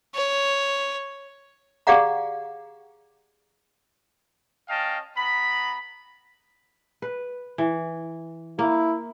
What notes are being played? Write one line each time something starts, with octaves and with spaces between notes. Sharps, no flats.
C#5
G4 G#4 D5 F5 F#5 A#5
C#4 D#5 F5 G5 A5
B3 A#5 B5
B4
E3
A#3 E4